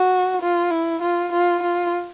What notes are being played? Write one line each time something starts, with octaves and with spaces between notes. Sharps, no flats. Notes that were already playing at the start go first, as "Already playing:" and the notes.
Already playing: F#4
F4
E4
F4
F4
F4